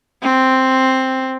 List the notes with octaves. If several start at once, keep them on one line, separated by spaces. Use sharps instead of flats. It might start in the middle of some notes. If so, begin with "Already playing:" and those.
C4